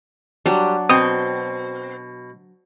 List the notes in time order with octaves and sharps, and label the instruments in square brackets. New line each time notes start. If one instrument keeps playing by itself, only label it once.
[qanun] F#3 D4 [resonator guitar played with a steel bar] G3
[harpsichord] B2 G5 [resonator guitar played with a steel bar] C4 [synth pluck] D#6